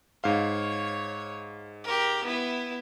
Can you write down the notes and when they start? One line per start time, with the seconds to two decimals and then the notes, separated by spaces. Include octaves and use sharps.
0.24 G#2 C#5 F5
1.84 G4 A#4
2.24 B3 E4